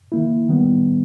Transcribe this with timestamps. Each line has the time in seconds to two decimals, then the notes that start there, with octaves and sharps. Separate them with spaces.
0.12 D#3 A#3 E4
0.49 D#3 G3 B3